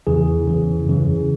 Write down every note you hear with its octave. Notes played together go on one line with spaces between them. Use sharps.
E2 C#3 E3 G#4
E2 C#3 E3
F#2 C#3 E3